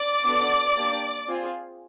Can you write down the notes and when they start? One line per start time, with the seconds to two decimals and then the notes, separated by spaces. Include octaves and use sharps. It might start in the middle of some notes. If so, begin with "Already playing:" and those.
Already playing: D5 D6
0.25 B3 D4 F#4 A4
0.76 A#3 D4 G4
1.28 C4 F4 G#4